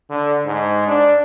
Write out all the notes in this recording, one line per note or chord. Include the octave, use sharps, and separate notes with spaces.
D3
G#2
D4